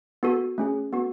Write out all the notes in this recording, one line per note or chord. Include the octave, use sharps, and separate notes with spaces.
B3 F#4 A4
A3 C#4 G#4
B3 F#4 A4